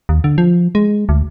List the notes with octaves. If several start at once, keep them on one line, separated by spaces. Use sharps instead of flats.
D#2
D3
F3
G#3
D2